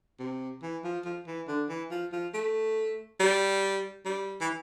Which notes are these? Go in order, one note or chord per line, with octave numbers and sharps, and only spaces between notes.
C3
E3
F3
F3
E3
D3
E3
F3
F3
A3
G3
G3
E3